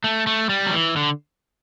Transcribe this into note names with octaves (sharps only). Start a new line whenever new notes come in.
A3
A3
G3
F#3
E3
D3